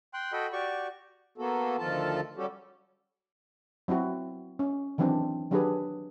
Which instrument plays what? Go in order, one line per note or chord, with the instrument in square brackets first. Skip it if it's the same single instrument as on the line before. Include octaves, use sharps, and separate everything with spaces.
[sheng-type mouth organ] G5 C6 F#6
F#4 A4 D#5 G5 B5
F#4 G4 D5 C#6
[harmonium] A#3 B3 F#4 A4
D2 D#3 F3 F4 A4 A5
G3 C#4 F#4 G4 A4
[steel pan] F#3 C4 E4 F#4
C#4
D#3 E3 F#3 C4 D4
D#3 F#3 D4 G4 G#4 B4